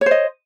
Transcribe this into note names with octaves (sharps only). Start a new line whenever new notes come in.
C5 C#5 D#5